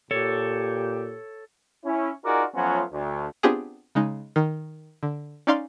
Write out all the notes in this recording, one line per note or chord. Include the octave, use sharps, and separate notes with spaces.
A#2 G4 A4 C#5
C#4 E4
D#4 F4 F#4 G#4 A#4 D5
F3 F#3 A3 B3 C#4 F4
D2
B3 C4 D4 F4 G4 G#4
C#3 G#3 D#4
D#3
D3
C#4 D#4 D5 F5 C6